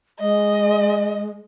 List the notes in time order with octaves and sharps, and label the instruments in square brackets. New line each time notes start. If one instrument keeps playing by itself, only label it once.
[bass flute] G#3 [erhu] D#5